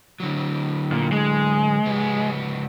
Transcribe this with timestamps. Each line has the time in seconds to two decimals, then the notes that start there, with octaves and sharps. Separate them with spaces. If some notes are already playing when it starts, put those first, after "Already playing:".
0.20 D3 F#3
0.92 A#2
1.12 G#3
1.86 C#2 B3